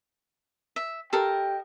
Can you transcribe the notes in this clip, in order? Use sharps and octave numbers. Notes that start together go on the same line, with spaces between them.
E5
G4 A4 A#4 D#5 G5